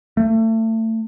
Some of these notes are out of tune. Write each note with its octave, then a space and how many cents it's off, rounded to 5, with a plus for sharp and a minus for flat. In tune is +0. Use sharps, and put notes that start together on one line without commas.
A3 +30